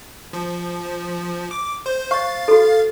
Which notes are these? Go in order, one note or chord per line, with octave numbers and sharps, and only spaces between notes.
F3
D6
C5
C5 F5 C#6 A6
F#4 A4